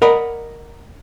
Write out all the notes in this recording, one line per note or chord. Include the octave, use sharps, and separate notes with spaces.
A#4 D5 D#5 F#5 A#5 B5